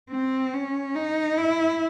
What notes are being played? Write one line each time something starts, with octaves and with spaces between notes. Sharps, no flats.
C4
C#4
D#4
E4